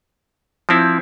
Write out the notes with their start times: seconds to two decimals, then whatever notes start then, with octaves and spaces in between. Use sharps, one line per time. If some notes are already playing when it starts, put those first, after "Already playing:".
0.69 F3 C4 E4